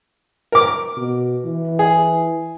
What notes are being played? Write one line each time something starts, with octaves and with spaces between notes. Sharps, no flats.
A#4 D6
B2
E3
G#4